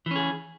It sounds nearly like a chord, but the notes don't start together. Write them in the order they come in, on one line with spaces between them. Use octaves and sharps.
E3 C#4 G#4